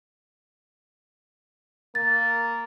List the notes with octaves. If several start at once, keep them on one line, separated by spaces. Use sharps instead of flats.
A#3 A6